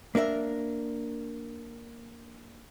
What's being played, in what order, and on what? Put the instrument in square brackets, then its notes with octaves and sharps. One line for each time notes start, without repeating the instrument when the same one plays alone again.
[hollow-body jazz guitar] A#3 D4 A#4 E5